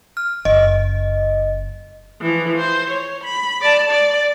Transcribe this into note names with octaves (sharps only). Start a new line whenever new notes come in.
F6
F#1 D#5
E3 F3
C5
C#5
B5
D5 A5
D5